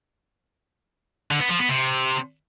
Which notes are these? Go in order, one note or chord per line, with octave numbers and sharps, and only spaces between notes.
D3
B3
F3
B3
C3